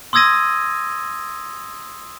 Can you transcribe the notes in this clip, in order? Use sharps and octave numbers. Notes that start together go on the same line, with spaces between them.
C6 D#6 E6 G#6 A#6 D#7